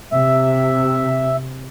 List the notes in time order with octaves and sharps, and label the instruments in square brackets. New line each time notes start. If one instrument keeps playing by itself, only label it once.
[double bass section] C3 [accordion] E5